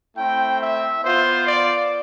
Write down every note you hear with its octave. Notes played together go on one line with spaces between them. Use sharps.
A3 C4 E4 G5
E5
B3 F4 C5
D5